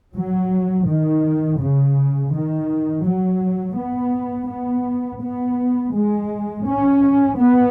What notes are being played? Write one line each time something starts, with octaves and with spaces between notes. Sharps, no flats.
F#3
D#3
C#3
D#3
F#3
B3
B3
B3
G#3
C#4
B3